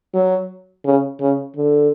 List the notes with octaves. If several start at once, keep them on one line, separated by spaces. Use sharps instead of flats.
F#3
C#3
C#3
D3